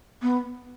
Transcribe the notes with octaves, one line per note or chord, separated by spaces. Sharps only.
B3